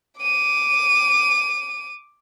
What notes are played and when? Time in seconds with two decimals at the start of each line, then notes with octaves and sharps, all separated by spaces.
0.20 D6 D#7